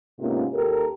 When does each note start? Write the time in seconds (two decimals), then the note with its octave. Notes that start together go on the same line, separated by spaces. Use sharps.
0.19 G#2 C3 A#3 B3 C#4 F4
0.53 D#2 G4 A4 A#4